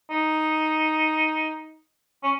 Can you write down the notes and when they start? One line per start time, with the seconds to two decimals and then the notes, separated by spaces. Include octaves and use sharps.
0.10 D#4
2.23 C#4